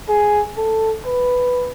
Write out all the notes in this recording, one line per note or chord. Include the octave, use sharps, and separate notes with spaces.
G#4
A4
B4